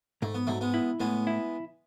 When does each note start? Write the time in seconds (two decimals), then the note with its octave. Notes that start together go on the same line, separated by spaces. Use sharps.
0.22 G#2 A3
0.34 B3
0.47 G#2 F#3 A3
0.61 G#3 B3
0.74 E4
1.00 A2 G#3 B3
1.27 E4